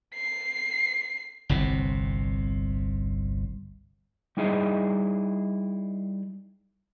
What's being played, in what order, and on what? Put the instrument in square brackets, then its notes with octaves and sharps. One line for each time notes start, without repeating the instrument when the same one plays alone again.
[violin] C7
[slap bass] G1 C2 C3
[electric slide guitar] G3 D#4 E4 G#4 D#5